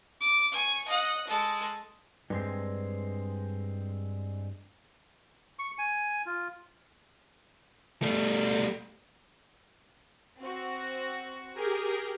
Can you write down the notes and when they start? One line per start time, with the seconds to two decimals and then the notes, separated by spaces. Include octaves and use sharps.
0.20 D6
0.52 G#5 C#6
0.88 D#5 F#5
1.27 G#3 A4
2.30 G2 G#3 C4
5.59 C#6
5.78 G#5
6.26 F4
8.02 G3 A3
10.39 C4 F#4
11.53 G4 G#4 A#4